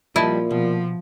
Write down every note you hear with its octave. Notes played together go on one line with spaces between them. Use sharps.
A#2 F3 G3 E4 D#5 A5
B2 F3